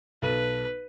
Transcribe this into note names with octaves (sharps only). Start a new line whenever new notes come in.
B1 A4 B4 D#7